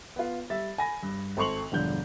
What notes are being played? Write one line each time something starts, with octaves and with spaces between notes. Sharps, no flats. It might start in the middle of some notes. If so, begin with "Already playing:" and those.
B3 F4
G3 E5 A6
G#5 B5 A#6
G2
G#1 A4 C6 C#6 F7 F#7
E1 G2 D3 F3 D4 G6